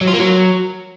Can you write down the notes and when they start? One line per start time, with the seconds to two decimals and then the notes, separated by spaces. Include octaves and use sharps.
0.01 F#3
0.07 F4
0.14 A#3
0.20 F#3